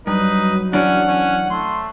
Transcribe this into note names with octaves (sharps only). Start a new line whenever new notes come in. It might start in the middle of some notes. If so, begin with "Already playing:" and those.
G2 F#3 D#4 B4
E3 C#4 D4 F#5
C#4
A3 C6